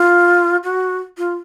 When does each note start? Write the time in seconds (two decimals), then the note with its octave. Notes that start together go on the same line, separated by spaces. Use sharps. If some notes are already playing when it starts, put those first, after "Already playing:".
Already playing: F4
0.64 F#4
1.18 F4